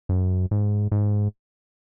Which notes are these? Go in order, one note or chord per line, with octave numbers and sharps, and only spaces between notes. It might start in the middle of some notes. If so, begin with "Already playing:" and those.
F#2
G#2
G#2